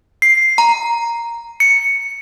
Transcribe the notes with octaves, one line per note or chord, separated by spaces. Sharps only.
C7
A#5
C#7